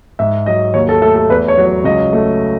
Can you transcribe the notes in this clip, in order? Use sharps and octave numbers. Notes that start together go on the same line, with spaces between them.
G#2 E5
F#3 D#5
D#2 C#5
A4
A3 A4
A4
E2 B4
C#5
F#3
C#5
C#2 D#5
A3